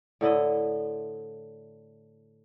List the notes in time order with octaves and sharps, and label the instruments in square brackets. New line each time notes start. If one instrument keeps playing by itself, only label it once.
[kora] A2 D3 E4 D#5